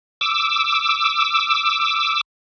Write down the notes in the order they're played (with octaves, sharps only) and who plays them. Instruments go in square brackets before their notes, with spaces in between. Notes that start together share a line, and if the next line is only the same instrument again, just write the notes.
[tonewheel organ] D6 E6